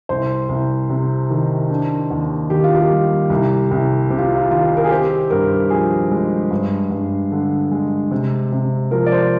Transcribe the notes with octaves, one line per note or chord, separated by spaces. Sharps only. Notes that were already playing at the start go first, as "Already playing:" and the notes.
C2 C5
C2
C3
D#3
D4
D#2
D#3 G4
F4
G4
G3
C2
C2
C3 G4
F4
F4
D#3 F4
A#4
G#4
C4 G4
G2 A#4
F3 G#4
G#3
G2
G2
D3
G#3
C3
C3
F3 A#4
D5
C5